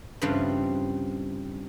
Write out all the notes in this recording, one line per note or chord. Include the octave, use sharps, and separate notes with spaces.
G2 C#3 E3 G3 C4 F4